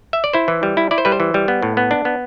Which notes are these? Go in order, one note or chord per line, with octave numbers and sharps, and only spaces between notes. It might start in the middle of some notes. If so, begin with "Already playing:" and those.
E5
D5
E4 C5
E3
G3
E4
E4 D5
C5
G3 B4
C5
E3
G3
B3
A2
B3
D4
B3